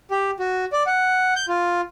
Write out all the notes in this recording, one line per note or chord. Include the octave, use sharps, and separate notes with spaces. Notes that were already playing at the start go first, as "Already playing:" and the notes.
G4
F#4
D5
F#5
G6
F4